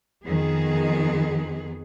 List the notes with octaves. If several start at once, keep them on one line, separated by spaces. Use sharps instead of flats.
F2 D#3 B3 G#4